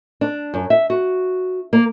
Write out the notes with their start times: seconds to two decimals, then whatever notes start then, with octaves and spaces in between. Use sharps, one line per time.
0.21 D4
0.54 F#2
0.70 E5
0.90 F#4
1.73 A#3